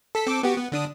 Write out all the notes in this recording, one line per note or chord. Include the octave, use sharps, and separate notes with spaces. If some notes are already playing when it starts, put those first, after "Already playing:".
A4 B6
C4 A4 D6
B3 F#4 G4
B3
D3 D4 D#6